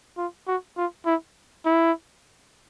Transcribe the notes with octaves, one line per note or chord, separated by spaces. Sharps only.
F4
F#4
F4
E4
E4